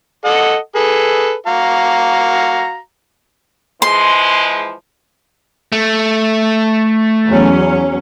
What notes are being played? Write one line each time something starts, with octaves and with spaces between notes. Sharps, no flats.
A4 D#5 F#5
G#4 A4 B4
F#4 F5 A#5
E3 F3 G#3 C6
A3
E2 F#3 C#4